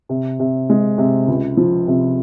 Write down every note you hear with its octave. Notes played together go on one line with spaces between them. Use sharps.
C3
C3
G#3
C3
C#2
F3
C3